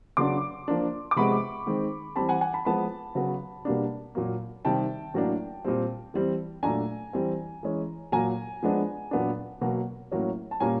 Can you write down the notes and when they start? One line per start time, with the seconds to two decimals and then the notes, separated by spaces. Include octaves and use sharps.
0.17 C#3 F#3 B3 D4 C6 D6
0.68 F3 A#3 D4
1.11 D6
1.16 C3 F3 G#3 B3 B5 C#6
1.67 D#3 G#3 C4
2.16 E3 G3 C4 A5 B5
2.29 F#5 G#5
2.41 F#5 G#5
2.53 A5 B5
2.65 F3 G#3 B3 A5 B5
3.15 C#3 F#3 B3
3.65 B2 G3 A#3 D4
4.15 A#2 F#3 A#3
4.65 C3 D#3 G3 G5 A5
5.14 A2 F#3 A#3 D4
5.65 A#2 G3 C4
6.14 E3 G3 C4
6.63 A#2 F#3 A3 D4 G#5 A#5
7.13 E3 G3 C4
7.63 E3 G#3 C#4
8.12 A#2 F#3 A#3 G#5 A#5
8.63 F3 G#3 B3 D4
9.11 A#2 F#3 B3 D4
9.61 B2 F#3 A#3
10.12 A2 F#3 A#3 C#4
10.51 A5
10.60 A#2 G3 A#3 C#4 G#5 A#5